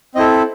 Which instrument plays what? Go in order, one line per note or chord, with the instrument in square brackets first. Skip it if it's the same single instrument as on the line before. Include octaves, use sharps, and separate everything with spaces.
[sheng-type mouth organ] C4 E4 A4 D#5